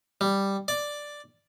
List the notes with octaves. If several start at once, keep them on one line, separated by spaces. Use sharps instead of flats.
G3
D5